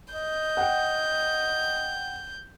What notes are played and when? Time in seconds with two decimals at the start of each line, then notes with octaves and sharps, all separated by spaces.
0.14 D#5 G6
0.57 F#5 G5